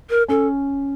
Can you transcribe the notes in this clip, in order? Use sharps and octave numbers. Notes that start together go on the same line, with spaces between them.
A#4
C#4 A4